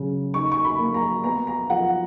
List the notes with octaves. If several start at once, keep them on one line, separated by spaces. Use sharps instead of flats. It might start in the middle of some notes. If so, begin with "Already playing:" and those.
Already playing: C#3 F#3
D#4 C#6
C#6
B5
A#3
A#5
B3 A#5
A#5
F3 F#5